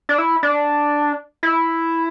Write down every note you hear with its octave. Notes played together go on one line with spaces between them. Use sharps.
D4
E4
D4
E4